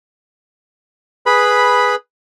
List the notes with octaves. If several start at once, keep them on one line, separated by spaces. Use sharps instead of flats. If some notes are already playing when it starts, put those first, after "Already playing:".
G#4 B4 B5